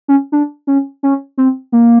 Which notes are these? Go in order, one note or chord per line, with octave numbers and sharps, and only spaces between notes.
C#4
D4
C#4
C#4
C4
A#3